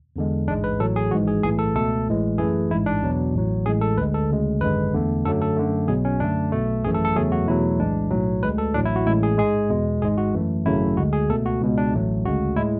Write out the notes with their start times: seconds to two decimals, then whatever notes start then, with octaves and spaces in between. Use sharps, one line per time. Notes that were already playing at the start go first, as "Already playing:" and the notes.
0.16 E2 D3 G#3
0.47 A1 G#2 G#3 D4
0.64 B4
0.80 A1 A2 F#3 A4
0.96 G#4
1.11 G#1 G#2 E3 G#3 F#4
1.27 G#4
1.43 B1 A2 E3 A3 G#4
1.59 A4
1.75 C#2 B2 A3 A4
2.07 A1 A2 E3 G#3
2.38 F#2 E3 A3 G#4
2.70 A1 G#2 G#3 E4
2.86 D4
3.03 E2 B2 F#3
3.34 A1 A2 F#3
3.66 A1 A2 G#3 G#4
3.81 A4
3.97 D2 D3 G#3 B4
4.14 A4
4.30 D2 C#3 G#3
4.61 G#1 F#2 D3 G#3 B4
4.94 E2 D3 A3
5.25 F#2 D3 F#3 A3 A4
5.41 A4
5.56 F#2 D3 A3
5.88 B1 B2 F#3 G#4
6.05 C#4
6.20 F#2 D3 A3 D4
6.52 B1 B2 A3
6.84 G#1 F#2 E3 A3 G#4
6.94 A4
7.05 A4
7.16 E2 C#3 F#3 A3 G#4
7.32 F#4
7.47 E2 B2 F#3 A3 E4
7.79 B1 A2 E3 G#3 D4
8.11 B1 A2 F#3 A3
8.43 D2 D3 G#3 B4
8.58 A4
8.74 A1 A2 F#3 D4
8.86 E4
8.96 F#4
9.07 A1 A2 G#3 E4
9.23 G#4
9.38 G#2 G#3 G#4
9.70 E2 B2 G#3
10.02 G#1 G#2 G#3 G#4
10.18 F#4
10.34 F#2 E3 A3
10.65 G#1 F#2 C#3 F#3 A3 E4
10.97 D2 D3 G#3 F#4
11.13 G#4
11.29 C#2 B2 A3 A4
11.46 F#4
11.61 C#2 B2 G#3
11.78 D4
11.93 A1 A2 F#3 A3
12.25 D2 C#3 G#3 F#4
12.56 A2 G#3 E4